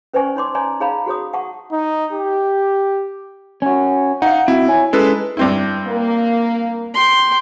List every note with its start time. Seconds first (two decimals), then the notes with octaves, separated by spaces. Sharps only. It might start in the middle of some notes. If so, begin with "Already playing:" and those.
0.14 C#4 B4 C5 D5 G#5 C#6
0.36 D#4 C#5 C6 D6
0.55 C#5 D5 G#5 A#5 C6
0.80 D#4 G#4 C#5 F5 A#5 B5
1.06 F#4 G#4 C#5 D#6
1.34 F#5 A5 C#6
1.72 D#4
2.13 G4
3.62 C#4 F#4
4.22 D#4 F5 F#5
4.48 C4 E4 F#4
4.68 C#5 G#5
4.93 G#3 C#4 E4 A4 B4
5.37 G2 C4 E4
5.86 A#3
6.94 G5 C6